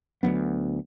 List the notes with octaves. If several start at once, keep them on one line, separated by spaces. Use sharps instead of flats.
D2 F#3 A#3 B3